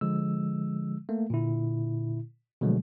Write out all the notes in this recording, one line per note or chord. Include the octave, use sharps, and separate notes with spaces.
D3 F3 G#3 E6
A3 A#3
A#2 D3 E4
B2 D3 F3 F#3 G#3 A3